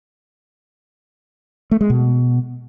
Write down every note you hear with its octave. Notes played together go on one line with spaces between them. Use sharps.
A3
G#3
B2